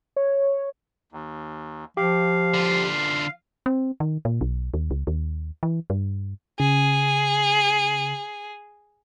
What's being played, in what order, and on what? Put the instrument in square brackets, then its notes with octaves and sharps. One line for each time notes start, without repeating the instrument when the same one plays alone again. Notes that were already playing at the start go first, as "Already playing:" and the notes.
[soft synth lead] C#5
[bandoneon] D#2
[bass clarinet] F3 [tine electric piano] G4 [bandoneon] F5
[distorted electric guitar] D3 F4
[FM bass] C4
D#3
A#2
B1
D#2
C#2
D#2
E3
G2
[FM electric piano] C#3 [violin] G#4